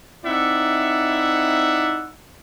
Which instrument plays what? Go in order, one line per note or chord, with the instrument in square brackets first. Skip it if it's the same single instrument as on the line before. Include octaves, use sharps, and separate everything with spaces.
[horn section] C4 D#4 E4 D5 E5 F#5